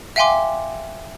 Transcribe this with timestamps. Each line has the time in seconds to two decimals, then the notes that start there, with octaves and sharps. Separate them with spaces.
0.16 E5 F5 G5 G#5 C6 D6